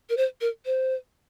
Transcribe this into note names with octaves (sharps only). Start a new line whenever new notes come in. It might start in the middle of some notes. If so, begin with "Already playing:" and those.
A#4
C5
A#4
C5